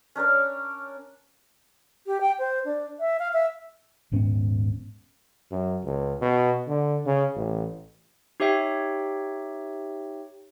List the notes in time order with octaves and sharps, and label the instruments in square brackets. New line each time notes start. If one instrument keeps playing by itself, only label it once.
[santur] C#4 D4 A#4 C#5
[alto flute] G4
G5
C5
D4
E5
F5
E5
[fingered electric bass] D#1 G#2 B3 C#4
[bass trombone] F#2
C#2
B2
D3
C#3
A1
[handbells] D#4 G4 C#5 E5 G5